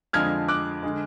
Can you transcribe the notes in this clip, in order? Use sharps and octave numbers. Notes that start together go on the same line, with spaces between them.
F2 D3 F3 G#3 D4 F6 G#6
D6 F#6
D3 G#3